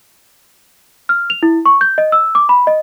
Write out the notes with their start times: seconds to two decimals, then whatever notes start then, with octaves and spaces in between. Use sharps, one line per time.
1.09 F6
1.30 F7
1.43 E4
1.66 C#6
1.81 G6
1.98 D#5
2.12 E6
2.35 D6
2.49 B5
2.67 D#5